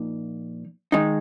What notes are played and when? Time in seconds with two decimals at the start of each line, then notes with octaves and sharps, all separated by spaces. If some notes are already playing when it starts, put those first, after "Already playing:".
Already playing: A#2 F3 A#3 D#4
0.92 D#3 G#3 D#4